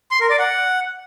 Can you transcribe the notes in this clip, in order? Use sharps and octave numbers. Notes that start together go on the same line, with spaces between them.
C6
A#4
D5
F#5